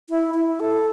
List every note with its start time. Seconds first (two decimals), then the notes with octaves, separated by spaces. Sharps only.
0.10 E4
0.35 E4
0.60 A4